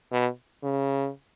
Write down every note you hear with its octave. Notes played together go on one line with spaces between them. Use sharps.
B2
C#3